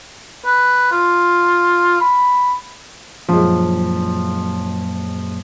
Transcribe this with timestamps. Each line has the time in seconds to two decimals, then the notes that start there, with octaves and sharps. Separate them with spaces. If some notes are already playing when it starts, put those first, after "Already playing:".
0.45 B4
0.92 F4
2.00 B5
3.29 F#2 A#2 F3 G#3